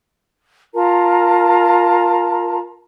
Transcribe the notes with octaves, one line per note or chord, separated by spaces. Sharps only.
F4 A#4 A5 A#5